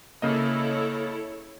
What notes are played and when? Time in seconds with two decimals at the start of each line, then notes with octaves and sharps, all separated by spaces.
0.22 C#3 A#3 E4 A4 C#5 D#5